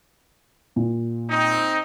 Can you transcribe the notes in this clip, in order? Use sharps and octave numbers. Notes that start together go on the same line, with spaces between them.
A#2
C4 D#4